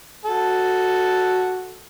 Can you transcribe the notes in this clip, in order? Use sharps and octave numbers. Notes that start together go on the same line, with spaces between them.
F#4 A4